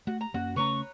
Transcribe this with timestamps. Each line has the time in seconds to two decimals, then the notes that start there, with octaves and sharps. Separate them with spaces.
0.07 A3 F#4
0.21 A#5
0.34 F#2 A#3 C#4 F#4
0.56 C#3 A3 C#4 B4 C#5 A#5 C#6